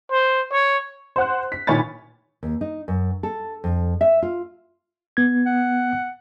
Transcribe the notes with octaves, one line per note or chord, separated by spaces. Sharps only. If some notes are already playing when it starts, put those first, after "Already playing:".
C5
C#5
C5 F#5 F#6
B6
A#2 D#3 C#5 G#5 B5 A6
D#2
D#4
F#2
A4
F2
E5
F4
B3 G#6
F#5